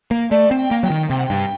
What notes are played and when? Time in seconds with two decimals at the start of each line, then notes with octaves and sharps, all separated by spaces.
0.11 A#3
0.31 A3 D5
0.51 C4
0.57 G5
0.71 A#3
0.83 F#3 G5
0.90 D#3
1.10 C3 G5
1.18 F#5
1.26 G2 G5